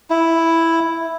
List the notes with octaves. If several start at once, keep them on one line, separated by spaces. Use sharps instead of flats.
E4